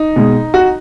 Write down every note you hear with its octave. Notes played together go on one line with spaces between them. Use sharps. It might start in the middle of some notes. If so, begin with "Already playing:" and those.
Already playing: D#4
B2 G#3
F#4